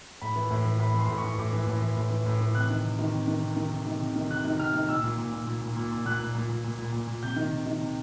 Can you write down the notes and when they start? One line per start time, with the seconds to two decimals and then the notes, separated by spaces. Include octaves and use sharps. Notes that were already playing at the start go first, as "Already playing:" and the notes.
0.22 A2 B5
0.36 E3
0.51 A2
0.65 E3
0.80 A2 B5
0.94 E3 C6
1.09 A2
1.18 C#6
1.24 E3
1.38 A2 D6
1.53 E3
1.67 A2
1.82 E3
1.97 A2
2.11 E3
2.26 A2
2.41 E3
2.55 C3 F#6
2.70 D#3
2.85 C3
2.99 D#3
3.14 C3
3.28 D#3
3.43 C3
3.57 D#3
3.72 C3
3.87 D#3
4.00 C3
4.16 D#3
4.30 C3 F#6
4.45 D#3
4.60 C3 F6
4.74 D#3
4.88 A#2 E6
5.04 A#2
5.18 A#2
5.32 A#2
5.47 A#2
5.61 A#2
5.77 A#2
5.92 A#2
6.06 A#2 F#6
6.20 A#2
6.35 A#2
6.49 A#2
6.64 A#2
6.79 A#2
6.93 A#2
7.07 A#2
7.23 C3 G6
7.36 D#3
7.52 C3
7.66 D#3
7.81 C3